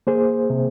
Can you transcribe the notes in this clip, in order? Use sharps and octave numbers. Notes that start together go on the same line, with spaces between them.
A#3 G#4 C5
C3